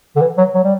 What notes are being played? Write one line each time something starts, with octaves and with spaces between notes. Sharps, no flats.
D3
E3
F#3
F#3
G3